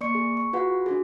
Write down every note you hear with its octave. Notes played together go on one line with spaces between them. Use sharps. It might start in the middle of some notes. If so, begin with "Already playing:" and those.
A#3 D5 C#6 C#7
G#4
C#6
F4 F#4 G#4 B4 F#5
D4 F#4 G#4